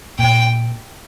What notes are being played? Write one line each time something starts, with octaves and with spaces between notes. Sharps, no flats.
A#2 G5